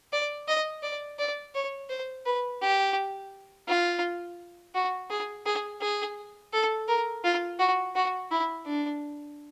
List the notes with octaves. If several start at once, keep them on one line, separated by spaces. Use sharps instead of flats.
D5
D#5
D5
D5
C#5
C5
B4
G4
F4
F#4
G#4
G#4
G#4
A4
A#4
F4
F#4
F#4
E4
D4